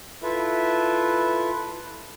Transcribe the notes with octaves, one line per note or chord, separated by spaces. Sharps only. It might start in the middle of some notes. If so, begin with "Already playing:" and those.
E4 F4 A4 B4 E5